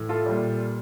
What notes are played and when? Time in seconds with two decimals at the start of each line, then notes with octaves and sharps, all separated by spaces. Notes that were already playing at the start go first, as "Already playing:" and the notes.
Already playing: A2 E3
0.09 F4 A4
0.26 A#2 G3